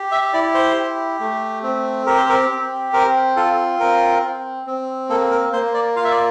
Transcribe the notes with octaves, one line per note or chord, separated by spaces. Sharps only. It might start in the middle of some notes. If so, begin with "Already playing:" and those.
Already playing: G4
E5
E4 D5
C5
G4
A3
C4
G4 A#4
C5
A#4
C4
C4 A#4
F4 A4
C4 A#4
C4
C4
A#3 A4
A#4
A#3 C5
D5
F4 F5
E5
D5